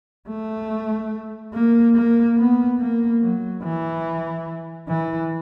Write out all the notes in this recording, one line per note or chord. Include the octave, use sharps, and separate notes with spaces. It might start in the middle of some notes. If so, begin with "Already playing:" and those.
A3
A#3
A#3
B3
A#3
F#3
E3
E3